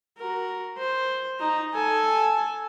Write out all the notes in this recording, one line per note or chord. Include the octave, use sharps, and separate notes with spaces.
F#4 A#4
C5
D#4 A#5
A4 G#5